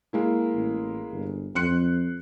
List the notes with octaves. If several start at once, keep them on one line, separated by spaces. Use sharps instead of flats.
G#3 A#3 E4
A1
G1
F2 C6 F#6 C#7